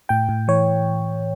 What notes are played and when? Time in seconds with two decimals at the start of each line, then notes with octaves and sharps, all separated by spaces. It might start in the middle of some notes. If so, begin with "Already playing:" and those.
0.09 A2 G5
0.29 A2
0.48 E3 C#5